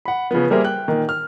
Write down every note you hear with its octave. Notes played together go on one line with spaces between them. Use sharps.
F#5 B5
C#3 F3 B3
G3 A#3 G#4 A#4 C5 E5
G5 F#6
A#2 D#3
F6